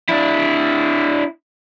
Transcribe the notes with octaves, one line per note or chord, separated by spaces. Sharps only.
D4 E4